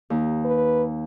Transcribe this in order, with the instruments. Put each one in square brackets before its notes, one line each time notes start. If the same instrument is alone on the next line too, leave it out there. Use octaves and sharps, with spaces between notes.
[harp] D#2
[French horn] B4